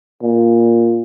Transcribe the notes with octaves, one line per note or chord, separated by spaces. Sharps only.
A#2